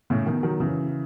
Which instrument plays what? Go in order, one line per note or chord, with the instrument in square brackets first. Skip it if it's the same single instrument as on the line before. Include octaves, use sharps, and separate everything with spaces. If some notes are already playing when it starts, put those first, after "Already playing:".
[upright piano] A2 C#3
B2 D#3
D#3 F#3
C#3 E3